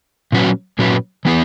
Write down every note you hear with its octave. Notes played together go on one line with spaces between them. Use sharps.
A#2 F#3 C#4 F#4 B4
A#2 F#3 C#4 F#4 B4
E3 B3 E4 G#4 B4